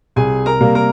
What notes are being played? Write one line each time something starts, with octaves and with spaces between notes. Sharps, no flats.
C2 G#4 G#5
A#4 A#5
C3 G3 A#3
A#4 A#5